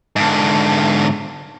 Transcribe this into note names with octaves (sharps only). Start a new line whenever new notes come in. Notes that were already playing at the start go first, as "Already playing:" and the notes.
G#2 D3